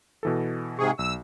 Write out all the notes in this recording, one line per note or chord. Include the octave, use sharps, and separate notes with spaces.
B2 E3 A4
G#2 C3 G#4 C#6
B1 E6